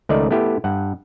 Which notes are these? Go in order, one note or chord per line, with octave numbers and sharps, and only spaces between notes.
C#2 D#3 A3 D#4 D5
A3 B3 E4 G4
G2 F#5